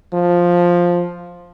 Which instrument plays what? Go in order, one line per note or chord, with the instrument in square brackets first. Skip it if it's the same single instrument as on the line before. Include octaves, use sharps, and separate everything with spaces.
[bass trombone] F3